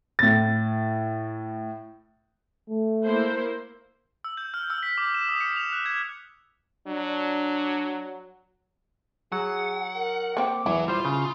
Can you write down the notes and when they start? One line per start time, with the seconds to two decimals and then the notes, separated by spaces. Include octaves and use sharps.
0.19 A2 A6
2.70 A3
3.04 A#3 E4 C5
4.24 E6
4.37 G6
4.54 F6
4.70 E6
4.83 B6
4.98 D6
5.14 E7
5.28 D#6
5.41 C#7
5.56 F7
5.72 F#6
5.86 G#6
6.87 F#3 D4
9.32 F#3 G#4 F#5
9.95 A#4
10.37 A#3 C4 G5 D6
10.66 E2 F#3 E4
10.88 G3 F4 C5 C6
11.05 C#3